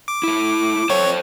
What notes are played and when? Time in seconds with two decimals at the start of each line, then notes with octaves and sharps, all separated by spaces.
0.08 D6
0.23 A3 E4
0.90 A4 C5 C#5 G5